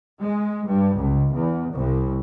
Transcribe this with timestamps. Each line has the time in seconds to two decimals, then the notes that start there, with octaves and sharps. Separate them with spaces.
0.23 G#3
0.69 G2
1.00 C#2
1.33 E2
1.74 C2